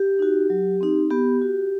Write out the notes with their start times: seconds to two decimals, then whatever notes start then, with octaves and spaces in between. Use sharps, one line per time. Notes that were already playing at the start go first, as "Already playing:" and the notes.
Already playing: G4
0.19 D#4 F#4
0.50 F#3
0.81 C4 D#4
1.11 B3 G4
1.42 F#4